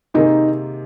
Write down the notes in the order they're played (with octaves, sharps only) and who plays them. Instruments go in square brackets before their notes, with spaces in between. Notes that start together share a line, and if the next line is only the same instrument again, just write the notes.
[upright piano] C3 D#3 A#3 G#4 [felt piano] D#4